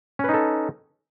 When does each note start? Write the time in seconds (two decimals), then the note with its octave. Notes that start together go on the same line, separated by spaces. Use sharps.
0.19 C#4
0.24 B4
0.29 D#4
0.34 A4